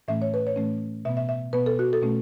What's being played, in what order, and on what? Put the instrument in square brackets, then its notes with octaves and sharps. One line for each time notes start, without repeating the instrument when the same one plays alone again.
[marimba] A2 E3 A3 C#4 E5
C#5
B4
C#5
A2 E3 A3 C#4
B2 E5
B3
E5
E5
B2 B3 B4
A4
F#4
A4
B2 A3 C#4